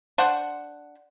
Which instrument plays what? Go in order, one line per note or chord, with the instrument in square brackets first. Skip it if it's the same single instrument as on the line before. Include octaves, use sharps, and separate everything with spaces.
[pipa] D4 C5 F#5